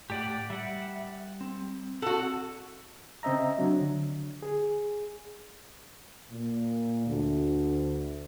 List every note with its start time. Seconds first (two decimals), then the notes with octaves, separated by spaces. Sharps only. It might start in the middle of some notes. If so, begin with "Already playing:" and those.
0.10 A2 G4 D5 F#5
0.50 G3 E5 F#5
1.41 C4
2.02 F#4 A4 F#5
3.23 C#3 C4 D#5 E5 A#5
3.59 F#3 D4
3.81 D3
4.42 G#4
6.31 A#2
7.06 D2